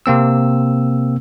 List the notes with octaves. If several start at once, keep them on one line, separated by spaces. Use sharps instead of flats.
C3 A#3 C4 E6